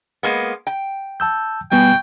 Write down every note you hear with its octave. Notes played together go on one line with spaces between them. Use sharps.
G#3 A#3 B3
G5
A5 E6 G6
B2 G3 B3 G5 G#5